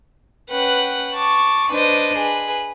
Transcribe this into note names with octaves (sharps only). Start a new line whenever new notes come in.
C#4 B4 F#5 G5
A5 C#6 D6
D4 B4 C5 D#5
G#4 B4